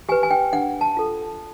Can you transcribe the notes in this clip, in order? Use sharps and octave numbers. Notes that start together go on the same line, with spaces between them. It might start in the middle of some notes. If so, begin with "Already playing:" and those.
G4 B4 G#5
G#5
G5
D4 F#5
A5
F4 A4